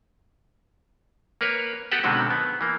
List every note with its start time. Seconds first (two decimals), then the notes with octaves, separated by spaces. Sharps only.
1.41 A#3 A#4 B4 C#5
1.91 B3 F#4 G4 A4 B4 F#5
2.03 B2 D3 D#3 F#3 G#3 C4
2.30 B3
2.61 E3 A#3